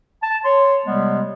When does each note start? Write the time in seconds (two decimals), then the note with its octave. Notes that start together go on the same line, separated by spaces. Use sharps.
0.22 A5
0.45 C#5 C6
0.86 C3 G3 G#3 B3